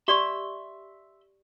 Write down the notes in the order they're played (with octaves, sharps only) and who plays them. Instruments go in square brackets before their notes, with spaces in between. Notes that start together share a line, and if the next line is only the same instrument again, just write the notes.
[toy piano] G4 D5 C#6 [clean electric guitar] E5 C6